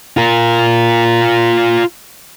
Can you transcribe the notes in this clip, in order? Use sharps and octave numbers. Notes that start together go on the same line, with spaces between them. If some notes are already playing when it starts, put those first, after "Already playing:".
F4 A#4